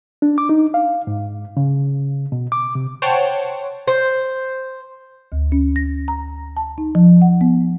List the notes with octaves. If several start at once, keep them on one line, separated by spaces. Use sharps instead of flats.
D4
D6
D#4
F5
G#2
C#3
B2
D6
C3
C5 C#5 F#5 G5 A5
C5
D2
C#4
A#6
A#5
A5
D#4
F3
F#5
B3